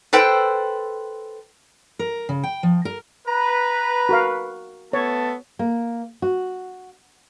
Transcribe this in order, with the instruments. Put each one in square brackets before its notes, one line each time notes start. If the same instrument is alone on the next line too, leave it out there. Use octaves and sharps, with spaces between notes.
[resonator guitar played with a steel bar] A4 B4 C5 G5
[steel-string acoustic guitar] A#4
C#3
G5
F3
A#4
[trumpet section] B4 [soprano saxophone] A#5
[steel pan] F#4 A#4 F5
[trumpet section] A3 A4 A5 [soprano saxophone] B3 [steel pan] C#5
[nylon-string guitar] A#3
F#4